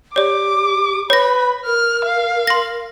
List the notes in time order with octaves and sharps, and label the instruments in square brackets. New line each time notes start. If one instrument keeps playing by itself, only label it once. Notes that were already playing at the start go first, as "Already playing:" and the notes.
[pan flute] G4 [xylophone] C#5 D5 [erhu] D6
[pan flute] B4 [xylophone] C#5 A#6 [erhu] B5
[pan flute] A#4 [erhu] F6
[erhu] F5
[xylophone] C6 A#6